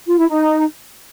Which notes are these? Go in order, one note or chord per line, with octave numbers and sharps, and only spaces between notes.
F4
E4
D#4